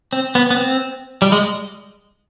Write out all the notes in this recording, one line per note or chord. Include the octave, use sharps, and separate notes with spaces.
C4
B3
B3
C4
G3
G#3